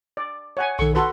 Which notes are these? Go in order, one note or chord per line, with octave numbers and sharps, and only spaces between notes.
D5
C#5 F#5 G#5
B1 D#3 A4 C#6
F#4 A4 B4 C6